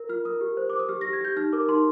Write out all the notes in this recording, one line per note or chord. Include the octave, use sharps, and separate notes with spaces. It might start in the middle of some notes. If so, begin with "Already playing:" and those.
Already playing: A#4
F4 F6
A#4 D#6
G4
C5
C5 D6
D#6
G4 F6
A#6
G4
G#6
G4 G6
D#4 F6
A#4 D6
D#4 C6